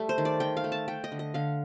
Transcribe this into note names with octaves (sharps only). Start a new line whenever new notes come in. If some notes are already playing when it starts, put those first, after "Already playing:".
Already playing: G3 A3
C5
D#3
D5
D#3 G5
F5
A3
A5
A3 G5
D#5
D3
D#5
D3 F5